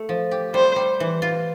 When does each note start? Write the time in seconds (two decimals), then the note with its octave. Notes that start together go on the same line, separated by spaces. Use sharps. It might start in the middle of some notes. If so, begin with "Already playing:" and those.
Already playing: A3
0.09 F3
0.31 G4
0.54 G3 C5
0.76 G3
1.00 E3
1.22 F4